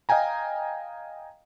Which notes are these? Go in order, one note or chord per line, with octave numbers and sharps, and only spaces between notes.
D#5 F5 G5 G#5 A#5